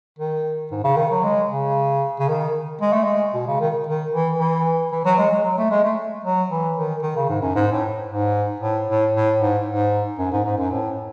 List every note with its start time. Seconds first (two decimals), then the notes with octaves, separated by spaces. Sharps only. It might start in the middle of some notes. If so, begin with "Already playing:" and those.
0.19 D#3
0.71 G#2
0.84 C#3
0.97 D#3
1.11 F#3
1.24 G#3
1.50 C#3
2.20 C#3
2.29 D#3
2.81 G#3
2.93 A3
3.04 G#3
3.34 B2
3.48 C#3
3.60 D#3
3.87 D#3
4.13 E3
4.39 E3
4.92 E3
5.05 F#3
5.18 G#3
5.31 G#3
5.44 F#3
5.58 A3
5.71 G#3
5.84 A3
6.24 F#3
6.50 E3
6.77 D#3
7.03 D#3
7.16 C#3
7.29 G#2
7.42 F#2
7.55 G#2
7.72 A2
8.07 G#2
8.60 A2
8.88 A2
9.13 A2
9.39 G#2
9.66 G#2
10.19 F#2
10.32 G#2
10.45 G#2
10.58 F#2
10.71 A2